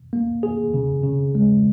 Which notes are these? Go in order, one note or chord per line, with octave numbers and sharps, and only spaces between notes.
A#3
G#4
C#3
C#3
G#3